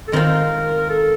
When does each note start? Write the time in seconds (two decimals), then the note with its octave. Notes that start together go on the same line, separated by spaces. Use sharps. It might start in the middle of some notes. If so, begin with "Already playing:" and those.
0.08 A4
0.12 D#3 G#3 C4 F4 A#4
0.90 A4